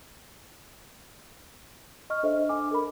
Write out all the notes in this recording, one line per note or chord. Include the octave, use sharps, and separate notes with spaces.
D#5 C#6 F6
D4 A4 C5 D#5 E5
D4 G#5 D6
A4 A#4 B5